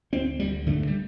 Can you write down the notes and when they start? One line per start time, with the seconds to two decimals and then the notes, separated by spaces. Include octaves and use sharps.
0.13 D2 C4
0.39 D2 G3
0.67 D3 A3
0.87 G3